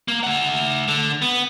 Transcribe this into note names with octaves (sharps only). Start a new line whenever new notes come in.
A#3
A3 F#5
D3
B3